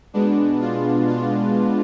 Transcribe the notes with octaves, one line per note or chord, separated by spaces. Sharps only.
B2 G#3 B3 D4
D4 F4
D4 F4